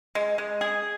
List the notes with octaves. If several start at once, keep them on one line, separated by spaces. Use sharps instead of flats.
G#3
G#3
G#4